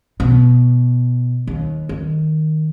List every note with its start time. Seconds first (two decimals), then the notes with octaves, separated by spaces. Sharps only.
0.20 B2
1.47 D#2
1.89 D#3